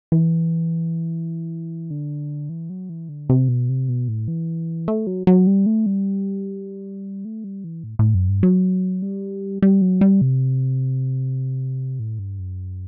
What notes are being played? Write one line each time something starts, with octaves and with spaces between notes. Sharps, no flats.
E3
D3
E3
F#3
E3
D3
C3
B2
C3
B2
A2
E3
A3
F#3
F#3
G3
A3
G3
A3
G3
E3
A2
A2
F#2
G2
F#3
G3
G3
F#3
G3
C3
A2
G2
F#2